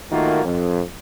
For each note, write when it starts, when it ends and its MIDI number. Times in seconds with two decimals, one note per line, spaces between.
0.11 0.42 51
0.11 0.42 57
0.11 0.42 58
0.11 0.42 65
0.11 0.42 66
0.45 0.80 41